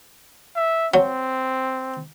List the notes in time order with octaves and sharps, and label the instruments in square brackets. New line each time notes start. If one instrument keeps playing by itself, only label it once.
[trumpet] E5
[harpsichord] F#3 [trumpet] C4